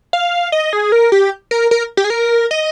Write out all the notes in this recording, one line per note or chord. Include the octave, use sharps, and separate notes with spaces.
F5
D#5
G#4
A#4
G4
A#4
A#4
G4
G#4
A#4
D#5